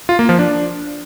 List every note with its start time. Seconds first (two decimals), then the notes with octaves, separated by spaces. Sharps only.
0.09 F4
0.19 A#3
0.29 F3
0.39 D4